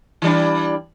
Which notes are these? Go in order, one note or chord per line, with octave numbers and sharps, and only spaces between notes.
E3 G3 D4